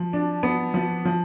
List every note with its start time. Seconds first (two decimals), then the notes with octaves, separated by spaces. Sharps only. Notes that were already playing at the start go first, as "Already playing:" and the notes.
Already playing: F3
0.13 D4
0.43 B3
0.74 F3
1.05 F3